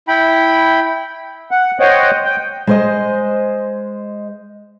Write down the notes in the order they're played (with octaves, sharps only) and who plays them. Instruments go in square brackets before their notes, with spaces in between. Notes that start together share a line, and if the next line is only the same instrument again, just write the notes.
[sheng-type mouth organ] E4 G5 B5
[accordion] F#5
C5 C#5 D#5 F#5 G5
G5
[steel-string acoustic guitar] G#3 C5 D#5